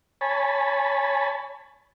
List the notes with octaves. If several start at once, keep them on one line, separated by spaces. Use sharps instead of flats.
C#5 G#5 A5 B5